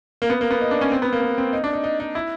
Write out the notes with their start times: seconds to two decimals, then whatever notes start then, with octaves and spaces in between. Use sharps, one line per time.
0.22 A#3
0.30 B3
0.41 A#3
0.51 B3
0.61 D#4
0.71 D4
0.81 C#4
0.92 C4
1.02 B3
1.13 A#3
1.22 B3
1.38 C4
1.53 D#4
1.64 D4
1.73 D#4
1.84 D#4
2.00 D#4
2.15 E4